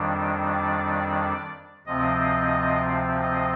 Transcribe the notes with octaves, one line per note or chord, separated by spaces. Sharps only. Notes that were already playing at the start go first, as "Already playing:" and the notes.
Already playing: F2 D#3 G3 D4
D5
D2 C3 F3 C4 D#5
D#5